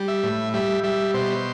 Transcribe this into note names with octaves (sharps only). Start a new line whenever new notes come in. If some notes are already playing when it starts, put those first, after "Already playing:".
Already playing: G3
E5
A2
G3 E5
G3 E5
B2 C5